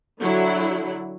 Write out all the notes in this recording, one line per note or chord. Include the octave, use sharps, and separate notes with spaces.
D3 F#3 E4